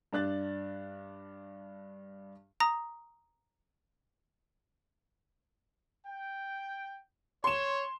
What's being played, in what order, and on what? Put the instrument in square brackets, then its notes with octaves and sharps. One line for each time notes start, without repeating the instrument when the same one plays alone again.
[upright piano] G2 D4 F#6 A6
[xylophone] A#5 D#6 A#6
[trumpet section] G5
[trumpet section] C#5 [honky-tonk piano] C6 E7